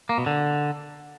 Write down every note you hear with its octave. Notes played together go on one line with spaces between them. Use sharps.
A#3
B2
D3